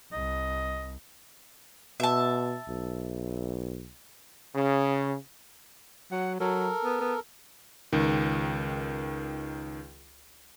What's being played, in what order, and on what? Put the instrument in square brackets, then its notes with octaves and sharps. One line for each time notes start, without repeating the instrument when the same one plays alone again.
[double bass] C2 [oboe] D#5
[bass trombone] B2 [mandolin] E5 A5
[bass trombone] B1
[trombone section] C#3
[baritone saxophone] F#3 [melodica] F#5
[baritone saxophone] F#3 [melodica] A4 A#4
[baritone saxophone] B3
B3
[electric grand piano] C#2 D#3